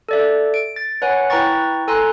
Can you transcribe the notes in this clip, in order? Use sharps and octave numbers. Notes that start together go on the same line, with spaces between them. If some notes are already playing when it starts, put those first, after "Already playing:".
A4 D5 E5
D7
A6
B4 C#5 F#5 G#5
E4 B4 G5 A#5 C#6 A6
A4 G#5 A#5 C6 F#6